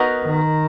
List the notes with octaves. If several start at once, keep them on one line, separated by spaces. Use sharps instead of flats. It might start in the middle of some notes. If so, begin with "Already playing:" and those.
Already playing: B3 D#4 F#4 A#4
D#3